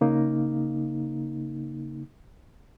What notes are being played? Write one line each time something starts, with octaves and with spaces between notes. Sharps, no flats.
C#3 A#3 D#4